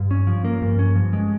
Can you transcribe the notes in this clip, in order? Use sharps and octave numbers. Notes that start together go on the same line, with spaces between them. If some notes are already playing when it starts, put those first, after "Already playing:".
Already playing: G2
C#4
F3
A#3
G2
C#4
F3
G#3